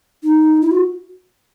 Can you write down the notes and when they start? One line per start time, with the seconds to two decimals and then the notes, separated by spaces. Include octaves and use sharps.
0.23 D#4
0.62 E4
0.71 F#4